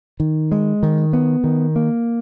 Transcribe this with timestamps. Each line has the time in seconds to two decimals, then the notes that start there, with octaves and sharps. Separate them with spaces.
0.20 D#3
0.52 G#3
0.83 D#3
1.13 B3
1.44 D#3
1.76 A#3